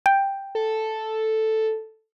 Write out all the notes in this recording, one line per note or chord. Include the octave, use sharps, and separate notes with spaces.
G5
A4